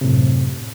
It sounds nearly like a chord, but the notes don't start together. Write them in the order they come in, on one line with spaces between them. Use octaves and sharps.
C3 A2 F#2